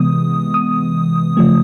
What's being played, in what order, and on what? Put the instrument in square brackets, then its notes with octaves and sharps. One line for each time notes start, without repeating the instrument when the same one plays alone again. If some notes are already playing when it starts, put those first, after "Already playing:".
Already playing: [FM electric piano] C3 E3 G#3 B3 D#6
D#6
C#3 F3 A3